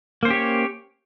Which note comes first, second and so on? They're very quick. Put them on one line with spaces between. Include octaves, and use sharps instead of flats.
A#3 C5 C#4 G4 C#5